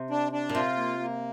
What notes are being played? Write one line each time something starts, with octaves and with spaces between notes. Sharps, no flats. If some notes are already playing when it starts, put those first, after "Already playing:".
Already playing: C3
D4
D4
A#2
C3 F4
A#3
A#3